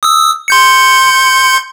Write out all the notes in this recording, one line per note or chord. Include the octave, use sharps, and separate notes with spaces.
D#6 E6
C6 G6 C#7